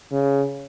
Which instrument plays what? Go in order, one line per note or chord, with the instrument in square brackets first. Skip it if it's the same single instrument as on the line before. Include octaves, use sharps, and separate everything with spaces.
[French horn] C#3